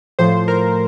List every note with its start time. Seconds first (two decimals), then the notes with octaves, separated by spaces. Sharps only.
0.19 A2 F3 C5
0.48 A#4